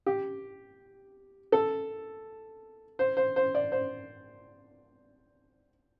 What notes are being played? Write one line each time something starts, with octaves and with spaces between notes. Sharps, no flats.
G4
A4
C5
C5
C5
D5
C5